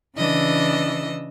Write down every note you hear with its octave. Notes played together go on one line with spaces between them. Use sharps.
C#3 E3 D4 D#5 E6